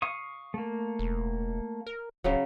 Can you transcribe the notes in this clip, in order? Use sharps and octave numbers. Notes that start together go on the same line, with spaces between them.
F5 C#6 D#6
A3 A#3
E1
A#4
D1 C#3 F#3